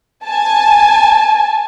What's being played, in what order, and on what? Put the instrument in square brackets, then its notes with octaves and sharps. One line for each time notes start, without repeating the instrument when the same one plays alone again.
[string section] G#5 A5